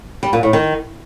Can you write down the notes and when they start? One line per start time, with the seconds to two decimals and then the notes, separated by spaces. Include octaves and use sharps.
0.23 G3
0.33 A#2
0.43 A2
0.53 D#3